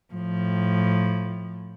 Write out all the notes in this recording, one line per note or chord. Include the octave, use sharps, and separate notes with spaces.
A2 F3